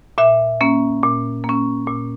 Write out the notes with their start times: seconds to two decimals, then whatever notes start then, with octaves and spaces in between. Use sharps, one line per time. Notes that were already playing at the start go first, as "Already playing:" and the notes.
0.18 A#2 E5
0.61 A#3 C#4
1.03 A#2
1.44 A#3 C#4
1.87 A#2